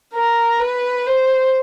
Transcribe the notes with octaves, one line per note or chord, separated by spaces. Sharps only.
A#4
B4
C5